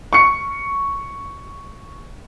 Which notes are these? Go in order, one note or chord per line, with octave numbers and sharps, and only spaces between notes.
C#6 C#7